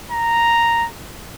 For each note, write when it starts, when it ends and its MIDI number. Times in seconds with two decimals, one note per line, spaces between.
0.11 0.87 82